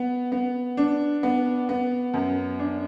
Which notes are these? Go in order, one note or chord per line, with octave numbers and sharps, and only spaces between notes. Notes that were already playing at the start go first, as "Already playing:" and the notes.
Already playing: B3
B3
D4
B3
B3
F#2
D4